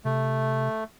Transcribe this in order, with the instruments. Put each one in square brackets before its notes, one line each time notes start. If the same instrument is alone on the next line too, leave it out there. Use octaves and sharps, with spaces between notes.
[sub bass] C3 [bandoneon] A3